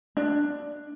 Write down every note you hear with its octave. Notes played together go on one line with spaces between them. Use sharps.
D4